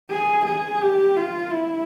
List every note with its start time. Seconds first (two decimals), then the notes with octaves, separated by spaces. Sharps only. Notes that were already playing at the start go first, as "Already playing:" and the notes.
0.10 G#4
0.46 G#4
0.81 G4
1.17 F4
1.52 E4